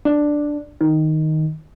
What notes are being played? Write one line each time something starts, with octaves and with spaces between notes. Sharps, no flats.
D4
D#3